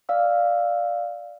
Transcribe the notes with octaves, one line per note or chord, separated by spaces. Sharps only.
D5 F5 E6